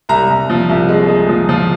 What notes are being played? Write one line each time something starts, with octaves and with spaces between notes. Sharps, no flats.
C2 A#5
C2
F3
C2
G#3
G#3
F3
F3